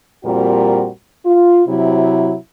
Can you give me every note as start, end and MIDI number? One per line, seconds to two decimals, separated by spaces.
0.24 0.89 41
0.24 0.89 46
0.24 0.89 55
0.24 0.89 60
0.24 0.89 66
0.24 0.89 70
1.25 1.62 65
1.67 2.35 48
1.67 2.35 54
1.67 2.35 64